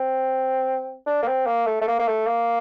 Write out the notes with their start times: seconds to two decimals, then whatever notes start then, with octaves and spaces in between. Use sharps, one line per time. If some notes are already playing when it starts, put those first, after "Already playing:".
Already playing: C4
1.07 D4
1.23 A#3
1.28 C4
1.46 A#3
1.66 A3
1.81 A3
1.88 A#3
1.99 A#3
2.08 A3
2.26 A#3